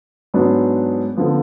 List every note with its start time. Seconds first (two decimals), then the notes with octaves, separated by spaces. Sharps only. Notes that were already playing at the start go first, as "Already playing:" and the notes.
0.34 G#2 F#3 B3 D4
1.17 D3 F3 B3